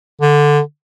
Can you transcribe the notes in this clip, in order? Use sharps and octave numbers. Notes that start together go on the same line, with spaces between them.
D3